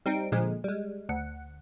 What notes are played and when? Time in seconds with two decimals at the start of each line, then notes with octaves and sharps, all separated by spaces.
0.06 G3 C4 D#4 D7
0.32 A#2 D3 F3 G#3
0.64 G3 G#3
1.09 D2 F#5